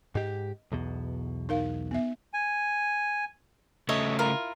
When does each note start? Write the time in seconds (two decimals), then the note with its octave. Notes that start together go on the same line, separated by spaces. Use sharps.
0.15 G#2 G4 D#5
0.72 B1 E2 B2
1.49 D#4 A#4 F5
1.91 B3 E5
2.34 G#5
3.89 C#3 A3 C#5 D#5 E5
4.19 E4 F4 A#4